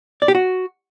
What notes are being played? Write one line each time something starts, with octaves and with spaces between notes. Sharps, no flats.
D5
G4
F#4